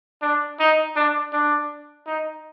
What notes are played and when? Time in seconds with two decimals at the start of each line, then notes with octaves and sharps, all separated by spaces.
0.22 D4
0.59 D#4
0.96 D4
1.33 D4
2.07 D#4